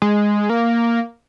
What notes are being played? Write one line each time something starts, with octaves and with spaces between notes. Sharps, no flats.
G#3
A#3